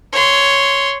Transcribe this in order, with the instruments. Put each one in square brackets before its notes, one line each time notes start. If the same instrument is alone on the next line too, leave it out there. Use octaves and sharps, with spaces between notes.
[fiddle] C#5 C6